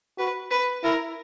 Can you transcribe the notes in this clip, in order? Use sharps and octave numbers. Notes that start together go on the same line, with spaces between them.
F#4 B4
B4
E4 A#4